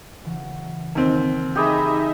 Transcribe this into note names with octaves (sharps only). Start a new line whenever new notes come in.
C#3 E3 F#3
D#2 C4
D#4 G4 G#4 D#5 E5 B5